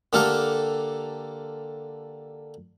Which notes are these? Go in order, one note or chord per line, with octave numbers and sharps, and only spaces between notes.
D3 A#3 G4 A4 A#4 F5